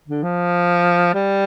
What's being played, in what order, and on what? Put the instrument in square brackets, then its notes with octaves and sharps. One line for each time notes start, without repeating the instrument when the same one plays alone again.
[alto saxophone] D3
F3
G3